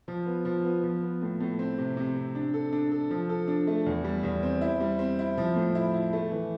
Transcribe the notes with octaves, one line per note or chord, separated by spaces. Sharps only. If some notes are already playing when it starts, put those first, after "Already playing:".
F3
B3
F3
B3
F3
B3
A2
A2
C4
C3
C3
C4
D4
A4
D4
A4
F3
A4
D4
A3
E2
G3
E2
C4
E4
G3
C4
E4
F3
A2
E4
E4
A3
E3